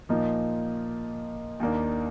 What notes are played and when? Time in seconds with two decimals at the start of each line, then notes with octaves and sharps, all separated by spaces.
0.09 A#2 F3 A#3 D#4
1.60 D#2 D#3 A#3 D4